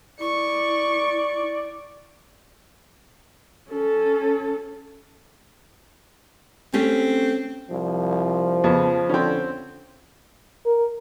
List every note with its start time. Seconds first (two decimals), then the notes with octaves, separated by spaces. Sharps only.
0.21 E4 D5 C#6
3.69 C#4 A4
6.73 A3 C4 C#4 G4
7.71 C2 F3
8.64 F2 C#3 B3
9.09 D3 C4 C#4
10.65 A#4